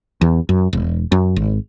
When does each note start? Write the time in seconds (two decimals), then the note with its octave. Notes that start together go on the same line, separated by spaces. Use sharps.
0.21 E2
0.49 F#2
0.73 E1
1.12 F#2
1.36 G#1